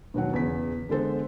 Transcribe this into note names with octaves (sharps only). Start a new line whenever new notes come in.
E1 D#2 F#3 F#5
E2 C#3 B6
D3 G#3 B3 A4 C5